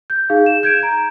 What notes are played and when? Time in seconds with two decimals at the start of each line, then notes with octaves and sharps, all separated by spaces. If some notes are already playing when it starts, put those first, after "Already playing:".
0.10 G6
0.30 D#4 G#4 F5
0.46 E7
0.63 G6 G#6 D7 E7
0.83 A#5